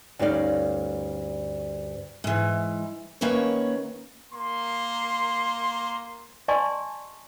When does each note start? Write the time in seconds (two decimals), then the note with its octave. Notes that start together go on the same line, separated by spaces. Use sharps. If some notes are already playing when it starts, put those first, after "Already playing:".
0.19 D2 G2 C#4 D#4 D5 F5
2.24 G#2 E3
3.21 D#3 A#3 C#4 B4 C#5
4.34 A#3 C6
6.48 D5 D#5 G#5 A5 C6 C#6